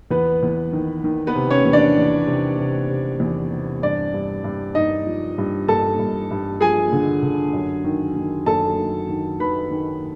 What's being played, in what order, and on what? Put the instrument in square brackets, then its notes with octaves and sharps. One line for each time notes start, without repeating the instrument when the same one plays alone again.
[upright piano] E2 B3 B4
E2
D#3
D#3
B3 B4
C3
C#4 C#5
E2
D4 D5
E2
C3
C3
C3
E2
C3
G2 D4 D5
G2
G2
G2 D#4 D#5
F3
G2
G2 A4 A5
G2
G2
F3 G#4 G#5
D3
D3
F#2
D#3
D#3
F#2 A4 A5
D#3
D#3
D#3 B4 B5
D#3